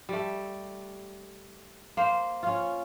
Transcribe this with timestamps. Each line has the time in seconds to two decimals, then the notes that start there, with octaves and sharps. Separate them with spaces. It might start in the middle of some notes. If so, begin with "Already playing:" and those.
0.09 G3 A3
1.97 A#3 C5
2.43 C#4 F4